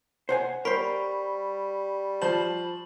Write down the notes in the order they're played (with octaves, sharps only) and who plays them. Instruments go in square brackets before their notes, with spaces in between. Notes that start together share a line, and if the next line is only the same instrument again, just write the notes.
[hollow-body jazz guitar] C5 F#5 G#5
[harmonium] G3 [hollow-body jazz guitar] A#4 C5 [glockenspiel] B5 C#6 B6
[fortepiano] F3 C5 A5 [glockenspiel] F#7